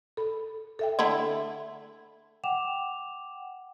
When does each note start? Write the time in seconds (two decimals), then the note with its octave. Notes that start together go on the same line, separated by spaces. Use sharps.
0.17 A4 B5
0.79 A4 E5 G5
0.99 D3 A3 E4
2.44 F#5 G5 D6 E7 F7